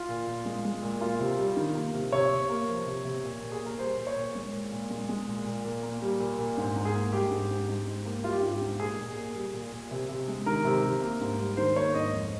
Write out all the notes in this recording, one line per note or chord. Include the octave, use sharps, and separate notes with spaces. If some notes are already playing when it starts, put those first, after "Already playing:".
Already playing: F4
A#2
A#2
G#3
G#3
A#2
A#3 F4
C3
G3
D#3
A#3
C3
C3 C#5
C3
A#3
F3
C3
C3
A#2
A#2
G#4
A#3
A#4
G3 C5
A#2
C#5
A#2
G#3
A#2
A#2
G#3
G#3
A#2
A#2
A#2
A#3
G3
A#2
A#2
G#2
G#2
G#4
A#3
G3 G4
G#2
G#2
G#2
G#2
A#3
G3 F4
G4
G#2 F4
G4
G#2
A#2 G#4
A#2
A#3
G3
A#2
A#2
C3
C3
G#3
D#3 A#4
C3
C3
A#3
G#2
G3
D#3 C5
A#3 C#5
G#2 D#5
F2